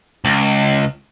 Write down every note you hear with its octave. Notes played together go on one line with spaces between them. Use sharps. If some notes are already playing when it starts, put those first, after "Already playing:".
C#2